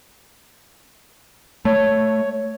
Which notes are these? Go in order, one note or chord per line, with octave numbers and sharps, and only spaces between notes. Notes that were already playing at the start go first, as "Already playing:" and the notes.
A3 C#5